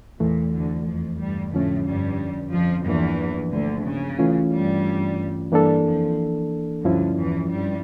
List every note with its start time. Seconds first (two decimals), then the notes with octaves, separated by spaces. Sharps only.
0.20 E2 A#2 E3 A3
0.53 D2 D3
0.86 F2 F3
1.20 G2 G3
1.53 F2 A2 D3 F3 A3 C#4
1.86 G2 G3
2.52 F2 F3
2.86 E2 G2 E3 F3 A#3 D4
3.52 D2 D3
3.86 C#3
4.19 E3 A3 C#4 F4
4.52 G2 G3
5.52 G2 E3 G3 A#3 D4 A4
5.85 F2 F3
6.84 D2 G2 D3 F3 C#4 E4
7.18 E2 E3
7.51 G2 G3